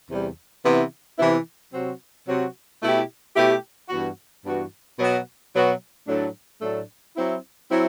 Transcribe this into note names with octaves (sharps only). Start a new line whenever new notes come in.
E2 C3 G3
C3 E3 B3 E4
C3 E3 B3 E4
C3 F#3 C4 F#4
C3 F#3 C4 F#4
B2 A3 E4 G4
B2 A3 E4 G4
G2 E3 B3 F#4
G2 E3 B3 F#4
B2 F#3 B3 F#4
B2 F#3 B3 F#4
A2 F#3 A3 D4
A2 F#3 A3 D4
F#3 C4 E4
F#3 C4 E4